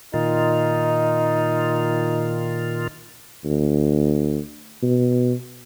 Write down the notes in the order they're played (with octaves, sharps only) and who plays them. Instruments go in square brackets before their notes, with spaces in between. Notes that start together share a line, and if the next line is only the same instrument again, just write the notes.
[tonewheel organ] A#2 D#3 F4 [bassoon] D#4
[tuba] D2
B2